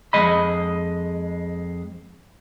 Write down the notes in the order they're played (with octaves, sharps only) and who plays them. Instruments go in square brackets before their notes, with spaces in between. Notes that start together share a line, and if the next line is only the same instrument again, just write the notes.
[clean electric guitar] F2 G#3 D#5 B5